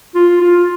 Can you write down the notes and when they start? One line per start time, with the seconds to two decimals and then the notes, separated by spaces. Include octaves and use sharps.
0.15 F4
0.41 F4